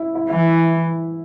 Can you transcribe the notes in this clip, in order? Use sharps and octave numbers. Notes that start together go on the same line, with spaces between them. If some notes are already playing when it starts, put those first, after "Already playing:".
Already playing: E4
E4
E3 E4